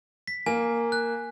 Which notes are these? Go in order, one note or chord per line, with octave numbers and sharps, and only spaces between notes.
B6
A#3 G#5
F#6